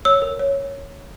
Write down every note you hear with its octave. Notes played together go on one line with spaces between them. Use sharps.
C#5 E6
A#4
C#5